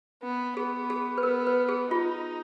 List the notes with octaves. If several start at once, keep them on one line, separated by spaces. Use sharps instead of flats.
B3
B3 G#4
G#4
B4
B3 A#4
B4
G#4
D#4 F4